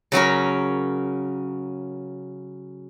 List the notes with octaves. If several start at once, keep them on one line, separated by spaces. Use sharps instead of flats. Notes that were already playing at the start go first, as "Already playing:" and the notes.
C#3 F#3 C#4 A#4